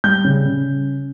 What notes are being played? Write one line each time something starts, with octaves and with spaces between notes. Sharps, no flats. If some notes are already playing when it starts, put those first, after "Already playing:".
G3 G6
C#3
C#3